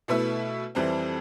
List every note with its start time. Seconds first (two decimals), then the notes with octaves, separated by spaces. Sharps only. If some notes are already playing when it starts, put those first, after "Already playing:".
0.08 B2 A3 E4 B4 E5
0.75 F2 E3 G3 C4